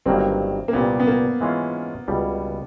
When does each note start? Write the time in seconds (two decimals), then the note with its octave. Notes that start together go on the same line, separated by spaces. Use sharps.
0.06 G1 G2 D#3 F#3 A#3 C4
0.68 A#3
0.73 C2 A#2 G3 B3
1.00 B3
1.07 A#3
1.41 E3 G#3 C#4 F4
2.08 C#2 B2 G3